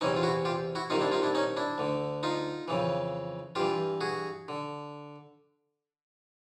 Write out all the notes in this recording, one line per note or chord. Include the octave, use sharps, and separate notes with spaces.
E2 C3 E3 C#4 D#4
F4
E4 F#4
F4 G4
E4 F#4
C2 C3 D#3 D#4 F4
D4 E4
D#4 F4
D4 E4
C#4 D#4
D4 E4
D2 D3
D#4 F4
F2 C#3 E3
G2 E3 F4 G4
F#4 G#4
D3